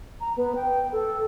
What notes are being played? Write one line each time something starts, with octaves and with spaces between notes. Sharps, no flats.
A#5
B3
G5
A4